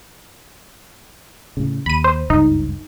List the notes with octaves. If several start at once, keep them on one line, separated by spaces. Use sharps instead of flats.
A2 C#3
D#2 B5 D#7
C5
F#1 C#2 G2 D#4